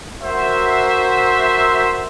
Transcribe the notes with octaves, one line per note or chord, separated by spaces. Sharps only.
F#4 A#4 C5 E5